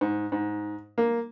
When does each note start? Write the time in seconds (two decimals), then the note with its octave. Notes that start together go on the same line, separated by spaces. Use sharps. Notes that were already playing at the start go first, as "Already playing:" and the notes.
0.01 G#2
0.32 G#2
0.98 A#3